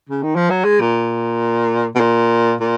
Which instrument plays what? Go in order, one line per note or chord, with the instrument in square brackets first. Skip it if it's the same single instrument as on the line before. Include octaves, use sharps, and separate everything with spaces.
[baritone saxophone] C#3
D#3
F3
F#3
G#3
A#2
B2
A#2
A#2